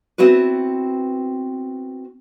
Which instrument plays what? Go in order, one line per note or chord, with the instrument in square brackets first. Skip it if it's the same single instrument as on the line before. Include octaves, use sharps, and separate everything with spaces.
[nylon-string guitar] B3 C4 E4 F#4 B4